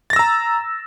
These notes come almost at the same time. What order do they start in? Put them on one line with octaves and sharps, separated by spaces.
A6 A#6 E6 A#5